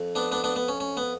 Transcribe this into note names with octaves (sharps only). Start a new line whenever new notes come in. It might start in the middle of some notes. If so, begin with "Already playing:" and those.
Already playing: F2
B3 D4
B3 D4
B3 D4
B3
C#4
C#4
B3